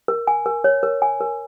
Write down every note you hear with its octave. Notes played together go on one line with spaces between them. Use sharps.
A#4
G#5
A#4
C#5
A#4
G#5
A#4